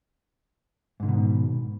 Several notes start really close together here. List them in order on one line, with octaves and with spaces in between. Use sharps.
G#2 D3 D#3 B2